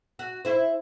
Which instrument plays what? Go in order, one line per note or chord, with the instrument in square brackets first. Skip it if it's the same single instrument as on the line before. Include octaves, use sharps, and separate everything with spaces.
[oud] F#4
E4 C5